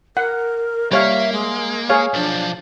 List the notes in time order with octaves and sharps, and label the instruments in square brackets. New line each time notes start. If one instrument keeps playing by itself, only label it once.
[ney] A#4 [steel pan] F#5
[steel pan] G3 C#5 F5 [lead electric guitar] A#3 [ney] E5
[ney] G#3
[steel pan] G#4 C#5 F5
[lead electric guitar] B1 F3 [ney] D4